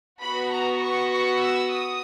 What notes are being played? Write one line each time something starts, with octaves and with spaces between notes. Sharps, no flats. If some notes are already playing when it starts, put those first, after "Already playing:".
B3 F#4 B5
A#5
C#6
C#6
E6
D#6